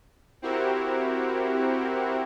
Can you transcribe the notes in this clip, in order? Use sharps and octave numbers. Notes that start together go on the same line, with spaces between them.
C4 E4 F#4 G4 A#4